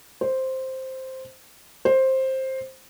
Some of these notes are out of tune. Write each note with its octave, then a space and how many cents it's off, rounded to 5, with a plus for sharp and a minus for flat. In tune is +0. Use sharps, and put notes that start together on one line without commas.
C5 +0
C5 +10